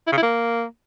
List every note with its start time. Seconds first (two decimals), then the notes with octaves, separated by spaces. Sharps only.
0.07 E4
0.12 C#3
0.17 E4
0.22 A#3